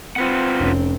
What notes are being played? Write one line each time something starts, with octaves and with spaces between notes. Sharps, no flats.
C4 F4 B4 F#5
F1 C#4